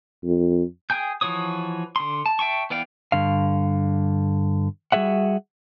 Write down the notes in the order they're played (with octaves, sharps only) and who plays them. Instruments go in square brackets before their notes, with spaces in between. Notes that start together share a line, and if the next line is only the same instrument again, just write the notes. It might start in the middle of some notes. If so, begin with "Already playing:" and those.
[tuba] F2
[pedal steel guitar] G#4 G5 G#5 G6
E3 F3 F#4 C#5 D#6
D3 C6
A5
E5 G5 A5 C#6
E3 B3 D5 F5 G5
[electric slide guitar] G2 D3 F5
G3 F#4 G#4 E5 F#5